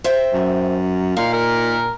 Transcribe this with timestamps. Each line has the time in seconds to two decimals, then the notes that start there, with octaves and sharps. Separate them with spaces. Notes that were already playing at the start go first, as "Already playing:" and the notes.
0.04 C5 E5 G5
0.33 F#2
1.17 A#2 D#4 F5
1.33 A#4